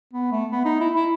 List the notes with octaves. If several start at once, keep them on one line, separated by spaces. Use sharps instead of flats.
B3
A3
B3
D#4
E4
E4